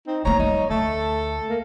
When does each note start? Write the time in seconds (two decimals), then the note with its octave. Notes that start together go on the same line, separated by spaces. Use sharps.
0.07 C4 D#4
0.25 A3 A#3 C#5 A#5
0.39 G3 D#4
0.70 D2 A3 A4
1.50 A#3